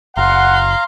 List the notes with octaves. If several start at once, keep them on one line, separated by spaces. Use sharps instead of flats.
F#1 F5 F#5 A#5 C6